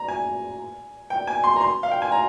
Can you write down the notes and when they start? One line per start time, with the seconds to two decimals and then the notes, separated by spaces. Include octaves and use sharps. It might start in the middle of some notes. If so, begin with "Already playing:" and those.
Already playing: A#5
0.08 G#5
1.10 G5
1.27 G#5
1.44 C6
1.56 A#5
1.61 C6
1.83 F5
1.91 G5
2.02 G#5
2.12 A#5